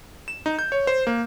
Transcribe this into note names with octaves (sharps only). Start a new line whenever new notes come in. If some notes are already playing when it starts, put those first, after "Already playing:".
E7
D#4
G6
C#5
C5
A#3